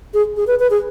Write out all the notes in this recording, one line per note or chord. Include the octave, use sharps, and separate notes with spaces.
G#4
G#4
B4
B4
G#4